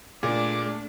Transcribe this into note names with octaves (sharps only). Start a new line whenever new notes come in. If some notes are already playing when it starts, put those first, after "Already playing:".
A#2 A3 D4 G#4 D5 D6